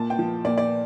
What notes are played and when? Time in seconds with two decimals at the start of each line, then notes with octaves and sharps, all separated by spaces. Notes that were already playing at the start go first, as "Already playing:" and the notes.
Already playing: A#2 A5
0.10 G5
0.19 F3
0.45 A#2 D5
0.58 D5